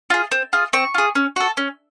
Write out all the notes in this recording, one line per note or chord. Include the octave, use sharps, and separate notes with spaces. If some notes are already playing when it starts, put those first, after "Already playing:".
F4 G#4
C4
F4 G#4
C4 C#6
F4 G#4
C#4
F#4 A4
C#4